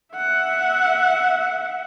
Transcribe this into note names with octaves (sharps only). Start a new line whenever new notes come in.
E5 F#5